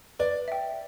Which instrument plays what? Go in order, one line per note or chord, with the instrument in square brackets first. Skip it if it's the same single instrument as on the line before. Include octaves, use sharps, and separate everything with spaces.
[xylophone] B4 [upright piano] D5
[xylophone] E5 G5